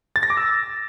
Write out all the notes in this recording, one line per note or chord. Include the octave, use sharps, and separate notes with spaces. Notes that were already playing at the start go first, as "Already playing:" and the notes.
A6
A#6
D6
E6